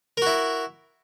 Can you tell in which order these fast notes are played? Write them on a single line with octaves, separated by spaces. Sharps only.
A#4 F#4 E4